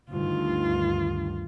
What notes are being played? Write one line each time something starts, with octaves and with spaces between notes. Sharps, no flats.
D2 G2 D#3 F4